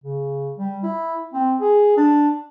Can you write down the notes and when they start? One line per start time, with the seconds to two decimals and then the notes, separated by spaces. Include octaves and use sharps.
0.04 C#3
0.58 G3
0.83 E4
1.33 C4
1.61 G#4
1.97 D4